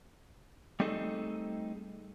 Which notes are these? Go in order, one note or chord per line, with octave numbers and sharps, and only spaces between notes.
G3 A3 C4 D#4 G#4 A4